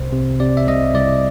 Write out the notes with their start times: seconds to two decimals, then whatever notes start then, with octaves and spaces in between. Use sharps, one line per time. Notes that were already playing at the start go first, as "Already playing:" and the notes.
Already playing: C2 C3 C5
0.13 C3
0.40 C3 D5
0.57 E5
0.68 C2 D#5
0.95 C2 D5